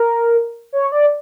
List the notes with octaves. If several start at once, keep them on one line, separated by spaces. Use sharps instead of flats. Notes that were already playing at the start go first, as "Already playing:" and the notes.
Already playing: A#4
C#5
D5